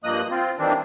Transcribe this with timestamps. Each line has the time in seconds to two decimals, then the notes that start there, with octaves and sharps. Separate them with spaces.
0.04 G2 F3 A#3 D#5 D#6 F#6
0.30 C4 F4
0.58 D#3 E3 G3 C4 D4